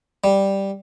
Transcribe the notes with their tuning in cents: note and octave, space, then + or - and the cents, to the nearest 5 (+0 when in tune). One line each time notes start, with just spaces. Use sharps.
G3 +0